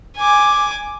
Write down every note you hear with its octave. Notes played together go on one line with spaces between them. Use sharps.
G#5 D6